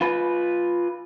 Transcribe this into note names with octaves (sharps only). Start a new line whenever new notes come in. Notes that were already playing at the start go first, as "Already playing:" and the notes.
F4 B4